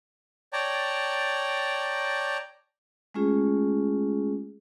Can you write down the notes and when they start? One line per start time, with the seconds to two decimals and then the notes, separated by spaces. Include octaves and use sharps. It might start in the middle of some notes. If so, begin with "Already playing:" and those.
0.53 C#5 D5 G5 A5 A#5
3.14 G#3 A3 C#4 F4 G#4